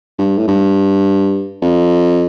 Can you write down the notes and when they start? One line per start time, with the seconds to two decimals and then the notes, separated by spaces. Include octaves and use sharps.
0.19 G2
0.38 A2
0.48 G2
1.62 F2